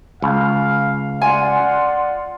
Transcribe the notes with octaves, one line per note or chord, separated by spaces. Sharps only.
C#2 F5
F4 D5 F#5 G#5 C6